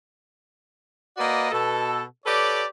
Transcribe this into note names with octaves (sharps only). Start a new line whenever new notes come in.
A#3 F#4 B4 D5 D#5
B2 A4
G4 A4 B4 C#5 D5